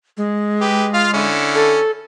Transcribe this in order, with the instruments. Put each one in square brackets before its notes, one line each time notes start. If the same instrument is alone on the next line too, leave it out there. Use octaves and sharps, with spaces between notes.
[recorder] G#3
[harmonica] G4 B4
F4 F5
D3 C#4 E4
[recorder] A4